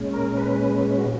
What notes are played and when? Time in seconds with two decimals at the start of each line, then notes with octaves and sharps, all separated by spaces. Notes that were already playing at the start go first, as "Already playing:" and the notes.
Already playing: A#2 G#3 C#4
0.13 A#4
0.37 B4
0.98 F#4